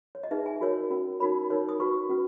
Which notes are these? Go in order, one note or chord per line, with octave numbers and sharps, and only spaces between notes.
C#5
D#5
D#4 G#4 B4 E5
G#5
F#4 A#4 C#5
C#4 F#4 A#4
D#4 F#4 A#4 C#5 B5
D#4 A#4 C#5
D#6
F#4 B4 C#6
C#4 F#4 B4